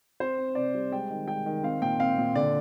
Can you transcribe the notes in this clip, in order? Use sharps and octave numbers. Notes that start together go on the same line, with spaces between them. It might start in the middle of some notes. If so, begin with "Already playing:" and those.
C4 C5
C4
C3 D5
G3
G#3 G5
D#3
G#3 G5
D#3
C4 F5
A#2 G5
C4 F5
A#2
D3 D5